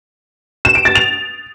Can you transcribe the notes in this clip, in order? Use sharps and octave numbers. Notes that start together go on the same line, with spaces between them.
E7
D7
A6
F7